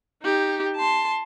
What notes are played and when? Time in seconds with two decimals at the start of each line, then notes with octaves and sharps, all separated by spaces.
0.23 D#4 G4
0.76 A5 C6